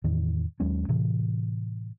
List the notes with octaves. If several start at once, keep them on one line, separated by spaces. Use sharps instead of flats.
E2 A2 D#3 E3
D#2 F#3 G#3 C#4
A2 C3 E3